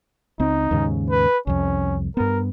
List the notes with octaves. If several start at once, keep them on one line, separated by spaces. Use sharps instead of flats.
C#2 C4 D#4
D#2 G#2 C#3
B4
C2 F2 C#4
G2 B3 A#4